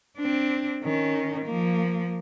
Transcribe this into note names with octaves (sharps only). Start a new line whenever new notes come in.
C4 D4
D#3 C#4
F3 A#3